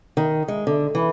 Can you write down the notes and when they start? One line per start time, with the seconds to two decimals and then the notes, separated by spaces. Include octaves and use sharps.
0.17 D#3
0.48 G#3
0.67 D3
0.95 E3